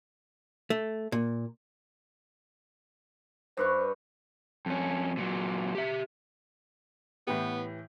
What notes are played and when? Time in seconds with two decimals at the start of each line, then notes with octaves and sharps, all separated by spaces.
0.70 A3
1.12 A#2
3.57 G2 B4 C5 C#6
4.66 F2 C#4
5.17 A#2 F#3
5.75 G4 E5
7.27 A2 E3 B3 G4